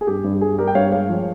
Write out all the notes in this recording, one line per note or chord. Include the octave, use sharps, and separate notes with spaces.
G#4
G2 G4
G2
G3 G#4
G3 G4 A#4
G5
G2 C#5 F5
G#3 C#5 F5
F3